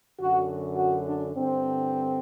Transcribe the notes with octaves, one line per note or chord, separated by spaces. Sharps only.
F#2 D3 F#4
F#4
D4
G2 D3 C4